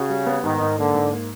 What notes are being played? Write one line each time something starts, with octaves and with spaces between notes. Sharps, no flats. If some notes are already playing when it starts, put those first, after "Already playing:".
Already playing: C#3 F#4
G3
B3
G#2 D#3
G#2
D3 A#3
G#2
A#3